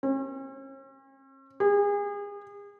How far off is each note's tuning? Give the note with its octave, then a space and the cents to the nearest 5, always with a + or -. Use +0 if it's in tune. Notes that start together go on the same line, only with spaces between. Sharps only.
C#4 -45
G#4 -35